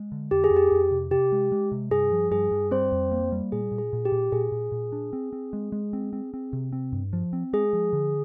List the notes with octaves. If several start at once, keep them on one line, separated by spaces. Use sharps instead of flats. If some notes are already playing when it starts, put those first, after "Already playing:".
Already playing: G#3
D3
F2 G4
G#4
F2
G4
F2
C3
C3 G4
G#3
G#3
C3
G2 G#4
F3
G2 G#4
G2
G3 C4 C5
F2
A#3
G3
A#2 G#4
A#2
G#4
A#2
G4
A#2
A#2 G#4
A#2
A#2
D4
C4
C4
G#3
G#3
C4
C4
C4
C3
C4
G2
F3
C4
G#3 G#4
F3
D3